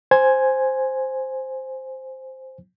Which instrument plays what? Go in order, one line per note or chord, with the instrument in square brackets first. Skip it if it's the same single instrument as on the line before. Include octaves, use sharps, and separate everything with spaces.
[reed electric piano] C5 G#5 G#6